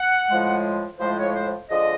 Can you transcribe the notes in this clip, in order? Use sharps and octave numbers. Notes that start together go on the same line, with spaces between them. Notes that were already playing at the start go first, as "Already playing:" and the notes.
Already playing: F#5
A2 F3 G#3
A2 F3 G#3 C5
C#5
C5
D3 F3 G#3 D#5